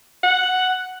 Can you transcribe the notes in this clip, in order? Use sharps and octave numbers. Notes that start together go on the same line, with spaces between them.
F#5